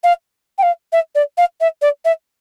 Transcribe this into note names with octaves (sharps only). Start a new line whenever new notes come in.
F5
G5
F5
E5
D5
F5
E5
D5
E5